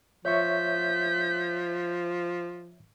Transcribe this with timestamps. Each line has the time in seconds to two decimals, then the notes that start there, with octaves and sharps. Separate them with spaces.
0.25 F3 C#5 E5 C#6 G6 B6